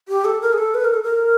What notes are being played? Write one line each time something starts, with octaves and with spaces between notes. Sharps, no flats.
G4
A4
A#4
G#4
A4
B4
A#4
A4
A#4